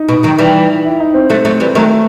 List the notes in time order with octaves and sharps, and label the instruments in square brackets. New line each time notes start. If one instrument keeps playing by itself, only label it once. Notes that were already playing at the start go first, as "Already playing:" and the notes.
Already playing: [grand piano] D#4
[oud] B2
D#3 F#3
E3 G3
[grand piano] E4
D#4
C4
[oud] F#3 A3
F#3 A3
E3 G3
[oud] D#3 F#3 [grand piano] A3